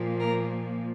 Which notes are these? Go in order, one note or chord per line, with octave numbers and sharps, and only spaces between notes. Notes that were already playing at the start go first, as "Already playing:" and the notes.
Already playing: A#2 F3 A#3
A#4